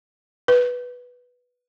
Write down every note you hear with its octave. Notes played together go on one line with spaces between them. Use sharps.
B4